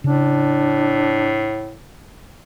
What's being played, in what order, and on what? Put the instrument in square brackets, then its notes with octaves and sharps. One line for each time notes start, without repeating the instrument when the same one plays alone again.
[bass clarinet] A2 [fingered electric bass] C#3 [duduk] D4